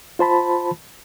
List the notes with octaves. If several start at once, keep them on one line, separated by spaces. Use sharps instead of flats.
F4 C5 A5 B5